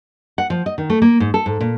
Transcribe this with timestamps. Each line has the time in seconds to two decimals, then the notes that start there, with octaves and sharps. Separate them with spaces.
0.38 F#5
0.50 F3
0.66 D#5
0.78 D#3
0.90 A3
1.02 A#3
1.20 G#2
1.34 A4
1.46 G#2
1.61 A#2